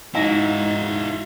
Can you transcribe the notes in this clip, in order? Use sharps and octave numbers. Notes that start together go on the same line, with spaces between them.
G#2 D#4 E4 F#4 D#5 F5